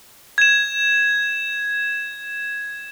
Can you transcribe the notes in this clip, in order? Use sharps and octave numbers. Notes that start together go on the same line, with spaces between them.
G#6 E7